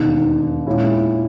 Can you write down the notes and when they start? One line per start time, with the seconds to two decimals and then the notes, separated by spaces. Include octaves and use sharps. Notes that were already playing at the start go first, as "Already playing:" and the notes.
Already playing: E1 D#2 D#3
0.67 A#2 G#3 C#4 E4